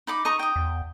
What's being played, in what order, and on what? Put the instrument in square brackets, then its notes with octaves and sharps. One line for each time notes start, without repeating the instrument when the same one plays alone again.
[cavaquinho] D#4 B5 D6
[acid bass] D#4 [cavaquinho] D#5 A#5 C#6
[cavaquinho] G5 D#6
[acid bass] E2